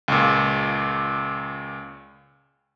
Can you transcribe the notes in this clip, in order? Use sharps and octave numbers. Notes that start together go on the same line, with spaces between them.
C#2 A#2